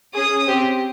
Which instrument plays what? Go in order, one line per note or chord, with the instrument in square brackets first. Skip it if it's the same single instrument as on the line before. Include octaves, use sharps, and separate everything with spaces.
[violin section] C#4 G#4 D#6
C4 G4